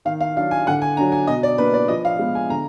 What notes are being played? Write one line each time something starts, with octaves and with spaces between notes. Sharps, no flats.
D#3 F5
F5
F#3 D4 F5
G#5
D3 F#5
G#5
F#3 D4 A#5
G#5
B2 D#5
D5
A#3 D4 B4
D5
F3 D#5
F5
G#3 B3
G#5
D3 A#5